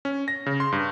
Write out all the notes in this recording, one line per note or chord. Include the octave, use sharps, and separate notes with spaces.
C#4
A#6
C#3
C6
G2